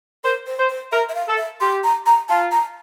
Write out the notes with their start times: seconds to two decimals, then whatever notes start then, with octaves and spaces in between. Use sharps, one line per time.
0.24 A#4 C5
0.46 C5
0.58 C5
0.69 C5
0.92 A#4 E5
1.09 E5
1.15 F5
1.27 A4
1.37 E5
1.60 G4 C6
1.84 A#5
2.06 A#5
2.29 F4 A5
2.52 A#5